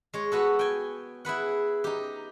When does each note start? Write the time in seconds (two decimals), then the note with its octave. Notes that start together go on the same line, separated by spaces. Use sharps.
0.13 G#3 C#5
0.32 B3 F#4 A4
0.59 G5 G#5
1.25 E4 G#4 B4 F#5
1.84 D#4 G4